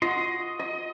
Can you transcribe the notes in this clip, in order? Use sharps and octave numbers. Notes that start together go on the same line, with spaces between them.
F4 F#4 D#5 C6
D#5